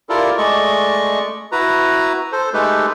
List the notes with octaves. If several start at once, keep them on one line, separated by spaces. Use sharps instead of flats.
E4 F4 G4 A4 A#4 D5
G#3 A3 D5 D#5 C#6
E4 F#4 B4 A#5
A4 C5
G#3 A3 D#4 G4 A4 B4